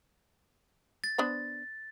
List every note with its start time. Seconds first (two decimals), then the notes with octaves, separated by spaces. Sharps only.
1.04 A6
1.18 B3 D4 C5